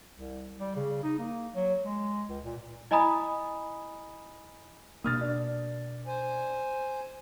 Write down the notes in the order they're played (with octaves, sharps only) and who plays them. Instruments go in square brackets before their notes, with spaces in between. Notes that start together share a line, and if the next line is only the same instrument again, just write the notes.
[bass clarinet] C2
G3
C#3
D#4
A#3
F#3
G#3
C#2
A#2
[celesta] E4 D#5 G#5 A#5 B5 D#6
[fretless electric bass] B2 A#3 [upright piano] D#6 F6 A6
[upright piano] D4
[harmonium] C5 G#5